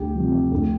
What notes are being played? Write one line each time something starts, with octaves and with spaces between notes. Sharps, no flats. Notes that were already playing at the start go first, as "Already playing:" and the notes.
Already playing: D2 G4
C3 F3
D2